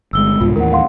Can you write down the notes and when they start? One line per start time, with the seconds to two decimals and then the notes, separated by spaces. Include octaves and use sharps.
0.13 G1 G#3 E6 G7
0.41 C2 G#2 B2 F4
0.56 D#2 A2 E3 A#4 F#5
0.72 F5 F#5 C6